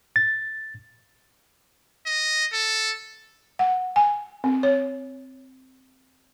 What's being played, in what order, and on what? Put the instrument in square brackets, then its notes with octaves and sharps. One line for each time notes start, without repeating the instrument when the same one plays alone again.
[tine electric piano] A6
[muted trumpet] D#5
A4
[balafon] F#5
G#5
C4
C#5